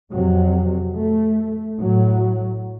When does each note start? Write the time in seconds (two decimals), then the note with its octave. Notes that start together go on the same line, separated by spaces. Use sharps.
0.12 F2 C3 F#3
0.96 A3
1.80 A2 F#3